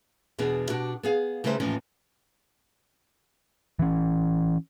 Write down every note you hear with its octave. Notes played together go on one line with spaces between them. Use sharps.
E2 B2 B3 D4 G#4
B2 D4 F#4 G4
B3 G#4 F5
C#3 G3 A3 D#4 B4 C5
D#2 A2 E3 F3 C#4
E3 C#4